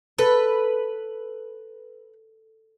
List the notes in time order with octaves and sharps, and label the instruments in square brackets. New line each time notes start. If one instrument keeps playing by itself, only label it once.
[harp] A4 [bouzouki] B4